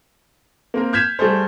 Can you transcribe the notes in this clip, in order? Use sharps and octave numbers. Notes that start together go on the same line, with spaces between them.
A#3 C4 A#4
F6 G6 G#6 B6 E7
G3 A3 G#4 A4 C5